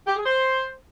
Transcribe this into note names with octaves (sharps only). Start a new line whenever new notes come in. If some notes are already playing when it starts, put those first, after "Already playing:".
G4
G#4
C5